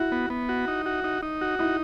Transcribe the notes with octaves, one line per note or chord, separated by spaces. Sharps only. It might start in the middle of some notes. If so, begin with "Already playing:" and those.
Already playing: E4 F#4
B3
B3
F#4
D#4
F#4
D#4
D#4
F#4
D#4 E4